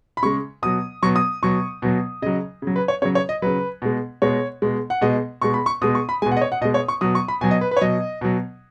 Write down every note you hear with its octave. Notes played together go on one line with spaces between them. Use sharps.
B5
C#3 G#3 C#6
B2 F#3 D#6
B2 F#3 C#6
D#6
B2 F#3 C#6
B2 F#3
C#3 F#3 D#5
C#3 F#3
B4
C#5
C#3 F#3 C#5
C#5
D#5
C#3 F#3 B4
B2 G#3
B2 G#3 C#5
B2 G#3
F#5
B2 G#3 D#5
B2 G#3 C#6
B5
C#6
B2 G#3 D#6
C#6
B5
B2 G#3 G#5
F#5
D#5
C#5
F#5
B2 G#3 D#5
C#5
C#6
B2 F#3 D#6
C#6
B5
B2 F#3 G#5
D#5
B4
B4
C#5
B2 F#3 D#5
B2 F#3